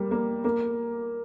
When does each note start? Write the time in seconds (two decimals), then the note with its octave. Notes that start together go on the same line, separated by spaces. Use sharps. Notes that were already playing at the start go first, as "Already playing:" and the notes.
Already playing: G3 A#3
0.11 A#3
0.44 A#3